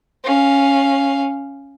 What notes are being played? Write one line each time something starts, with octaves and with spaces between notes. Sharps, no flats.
C#4 F5